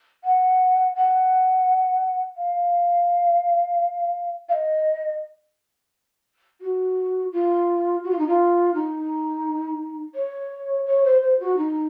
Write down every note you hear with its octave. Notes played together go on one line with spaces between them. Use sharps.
F#5
F#5
F5
F5
D#5
F#4
F4
F#4
F4
D#4
F4
D#4
C#5
C#5
C5
C5
F#4
D#4